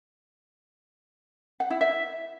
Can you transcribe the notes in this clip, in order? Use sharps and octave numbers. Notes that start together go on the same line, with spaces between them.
F#5
E4
E5